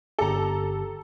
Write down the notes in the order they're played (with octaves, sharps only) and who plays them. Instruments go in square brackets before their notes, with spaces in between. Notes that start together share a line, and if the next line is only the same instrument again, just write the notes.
[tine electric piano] G1 G4 [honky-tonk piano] A4 A#5